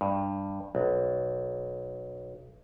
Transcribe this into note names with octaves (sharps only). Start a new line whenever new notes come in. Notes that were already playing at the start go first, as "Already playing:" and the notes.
G2
B1